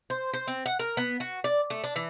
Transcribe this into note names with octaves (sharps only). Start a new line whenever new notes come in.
C5
C5
C4
F#5
A#4
B3
F#4
D5
A3
D4
E3